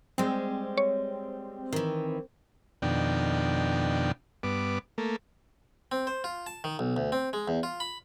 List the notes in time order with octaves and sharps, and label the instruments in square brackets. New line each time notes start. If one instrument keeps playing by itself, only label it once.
[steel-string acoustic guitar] G3 G#3 [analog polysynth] C4
[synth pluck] C#5
[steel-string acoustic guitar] D#3 E3
[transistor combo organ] F2 B2 D#3 D4 G5
G2 B3 D6
A3 A#3
[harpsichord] C4
C5
F4
A5
D#3
B1
D2
C4
G#3
E2
F4
B5